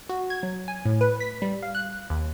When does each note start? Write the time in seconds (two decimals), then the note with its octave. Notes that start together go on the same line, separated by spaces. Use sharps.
0.09 F#4
0.30 G#6
0.43 F#3
0.68 G#5
0.85 A2
1.01 B4
1.20 B6
1.42 G3
1.63 F5
1.75 F#6
2.10 D#2